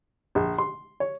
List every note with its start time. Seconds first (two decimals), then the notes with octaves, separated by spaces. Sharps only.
0.35 A#1
0.58 C6
1.00 C#5